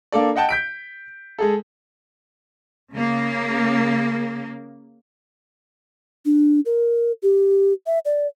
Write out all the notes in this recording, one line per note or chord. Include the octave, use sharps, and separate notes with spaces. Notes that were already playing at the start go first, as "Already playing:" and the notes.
A#3 D4 A4 D5
D#5 F#5 G5 A5
G6 B6 D7
G#3 G#4 A4
C#3 A#3
D4
A#4
G4
E5
D5